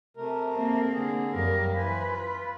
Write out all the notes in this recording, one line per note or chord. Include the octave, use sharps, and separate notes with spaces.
C3 A3 A#4
A#3 C4
D3 G#4
F#2 G3 A#3 G4 A#4
E3 B4 C5 G#5
F4